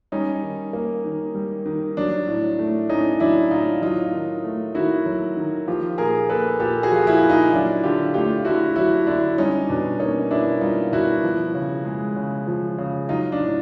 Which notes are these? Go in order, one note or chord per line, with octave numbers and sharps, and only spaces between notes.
G3 C#4 D#4
D#3
A#3
D#3
G3
D#3
F#3 D4
A2
A3
A2 C#4 D#4
F#3 D4 E4
A2 D#4 F4
F#3 D#4 F4
D#3
A3
D#3 E4 F#4
F#3
D#3
F3 F4 G4
A#2 G#4 A#4
A#3 A4 B4
A#2 G4 A4
F#4 G#4
F3 F4
E4 F#4
A#2
D#4 F4
F#3 D4 E4
D3 F4 G4
A3 F4 G4
D3 E4 F#4
F#3 E4 F#4
D3 D4 E4
G3 C#4 D#4
B2 D4
A#3 C#4 D#4
B2 D4 E4
G3 D#4 F4
B2 E4 F#4
F3
C#3
G#3
C#3
F3
C#3
F#3 D#4 F4
D4
A2